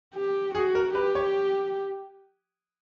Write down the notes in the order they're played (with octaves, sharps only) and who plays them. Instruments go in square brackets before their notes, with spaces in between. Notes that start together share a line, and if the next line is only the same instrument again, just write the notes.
[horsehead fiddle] G4
[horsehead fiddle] F#4 [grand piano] G#4
[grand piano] A#4
[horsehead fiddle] G4 [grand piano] B4
[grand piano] C#5